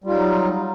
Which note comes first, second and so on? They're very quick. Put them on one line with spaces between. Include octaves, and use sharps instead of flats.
G3 F4 D#4 F#3